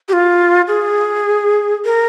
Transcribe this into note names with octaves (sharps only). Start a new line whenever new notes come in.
G4
F4
G#4
A#4